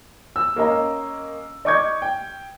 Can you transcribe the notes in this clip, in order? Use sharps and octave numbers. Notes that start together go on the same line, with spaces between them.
E6
A#3 C#4 D#5 A#5
D5 D#5 C#6 D6 G6 G#6
G5